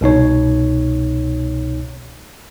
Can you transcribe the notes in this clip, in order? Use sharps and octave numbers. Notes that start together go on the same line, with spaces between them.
C2 B2 D#4 C#5